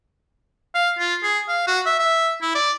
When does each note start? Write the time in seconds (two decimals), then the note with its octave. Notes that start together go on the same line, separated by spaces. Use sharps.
0.75 F5
0.99 F4
1.23 G#4
1.48 F5
1.67 F#4
1.86 E5
1.99 E5
2.42 E4
2.55 D5